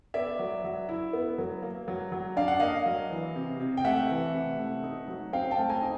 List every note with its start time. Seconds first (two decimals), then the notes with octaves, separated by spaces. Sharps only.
0.14 B3 D5 E5
0.39 F#3
0.64 F#3
0.89 E4
1.13 B3
1.38 F#3
1.63 A#3
1.88 F#3
2.12 F#3
2.37 D4 F5
2.48 F#5
2.60 A#3 D#5 F5
2.86 F#3
3.10 E3
3.36 C3
3.60 C3
3.77 G5
3.84 A3 E5 F#5
4.10 E3
4.34 C3
4.59 A3
4.83 D#4
5.08 F#3
5.33 C4 F5 G5
5.51 G5 A5
5.58 A3
5.70 G#5 A#5
5.82 D#4